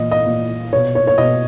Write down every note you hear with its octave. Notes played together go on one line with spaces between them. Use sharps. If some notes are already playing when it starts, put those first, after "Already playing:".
Already playing: A#2 E3 D#5
D#5
A#2
B2 C#5
C#5
C#5
B2 D#5